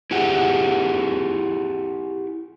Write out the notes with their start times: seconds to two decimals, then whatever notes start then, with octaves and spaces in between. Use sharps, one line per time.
0.11 E4 G4 G#4 F#5